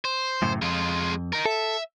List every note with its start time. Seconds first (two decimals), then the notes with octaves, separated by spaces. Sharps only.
0.05 C5
0.42 F#2 A2 C#3
0.62 F2 G#3 F4
1.33 D#4 A#4
1.45 A4 E5